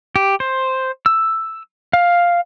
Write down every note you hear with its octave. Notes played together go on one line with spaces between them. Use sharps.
G4
C5
E6
F5